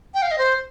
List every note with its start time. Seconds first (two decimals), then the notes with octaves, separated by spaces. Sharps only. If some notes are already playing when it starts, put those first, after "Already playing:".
0.14 G5
0.22 F5
0.31 D#5
0.38 C5